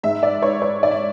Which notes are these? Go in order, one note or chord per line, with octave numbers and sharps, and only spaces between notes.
G#2 G#3 E5
D5
C#5
C#5
D5
E5